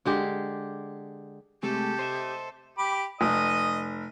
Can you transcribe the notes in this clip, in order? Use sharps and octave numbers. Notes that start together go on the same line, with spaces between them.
D3 G#3 G4
C3 G#3 A3 G4 A4
C5 D#5 E5
G4 B5 D6
F1 D#5 D#6